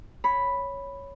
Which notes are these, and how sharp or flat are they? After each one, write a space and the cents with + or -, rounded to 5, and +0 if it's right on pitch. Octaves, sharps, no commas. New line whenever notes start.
C#5 +0 B5 +0